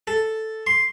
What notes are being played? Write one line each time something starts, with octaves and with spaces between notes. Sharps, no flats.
A4
C6